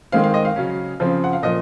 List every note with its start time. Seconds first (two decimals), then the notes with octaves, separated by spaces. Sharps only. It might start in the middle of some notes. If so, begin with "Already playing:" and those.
0.12 D#3 G#3 C4 F5
0.24 F5
0.34 D#5
0.45 F5
0.56 C#3 F#3 C#4
1.00 C#3 F3 C4
1.24 F#5
1.33 F5
1.43 A#2 F3 D#5